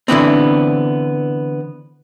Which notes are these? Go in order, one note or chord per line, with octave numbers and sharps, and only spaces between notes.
D3 E3 B3 C4